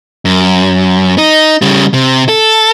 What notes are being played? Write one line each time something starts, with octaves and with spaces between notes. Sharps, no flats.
F#2
D#4
C#3 G3
C3
A4